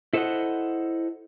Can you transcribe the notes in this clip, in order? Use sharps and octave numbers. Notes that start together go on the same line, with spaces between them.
E4 A4 C5 D5 D#5 F#5